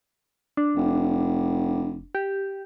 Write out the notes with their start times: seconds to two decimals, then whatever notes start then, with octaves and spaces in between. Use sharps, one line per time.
0.57 D4
0.76 F1
2.15 G4